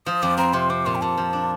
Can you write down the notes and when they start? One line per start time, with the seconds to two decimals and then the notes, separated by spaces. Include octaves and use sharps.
0.06 F3 D#6
0.22 F2 D6
0.37 C4 A#5
0.53 C3 C6
0.70 C4 D6
0.86 A#2 C6
0.95 G5
1.01 A#2 A5
1.17 F3
1.33 D4